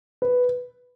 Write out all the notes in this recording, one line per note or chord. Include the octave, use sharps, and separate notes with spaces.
B4